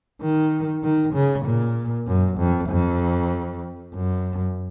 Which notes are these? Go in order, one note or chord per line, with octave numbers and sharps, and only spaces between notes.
D#3
D#3
C#3
A#2
F#2
F2
F2
F#2